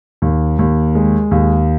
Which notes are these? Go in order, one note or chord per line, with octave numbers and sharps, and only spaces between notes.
D#2
D#2
G#3
D#2